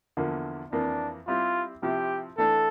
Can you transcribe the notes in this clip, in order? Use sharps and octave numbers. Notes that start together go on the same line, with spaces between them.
E2 D3 F3 A#3
F2 E3 A#3 D4
G3 C4 E4 F4 G4
C3 F3 C4 E4 G4
E3 A3 D4 A4